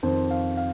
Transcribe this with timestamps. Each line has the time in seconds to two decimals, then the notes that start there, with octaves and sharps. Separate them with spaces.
0.03 F2 D#3 C5
0.30 F5
0.57 F5